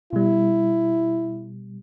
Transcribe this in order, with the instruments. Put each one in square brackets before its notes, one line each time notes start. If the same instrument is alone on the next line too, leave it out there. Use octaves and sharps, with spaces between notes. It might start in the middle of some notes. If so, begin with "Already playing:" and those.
[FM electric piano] B2 G3 [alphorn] E4